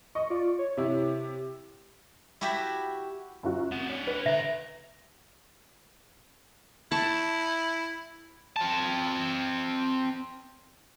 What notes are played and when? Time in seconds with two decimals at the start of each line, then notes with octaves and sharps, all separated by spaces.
0.15 D#5 C#6
0.30 F4 D5
0.59 C#5
0.77 C3 E4
2.41 E4 F#4 G4 E5 A5 B5
3.43 F#2 F4 F#4
3.71 C4 F#5 E7
3.87 D4 C#5
4.07 B4
4.26 D3 E5 A#5
6.92 E4 A5 C#6
8.57 C4 A5